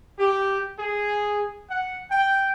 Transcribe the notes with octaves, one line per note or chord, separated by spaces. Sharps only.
G4
G#4
F#5
G5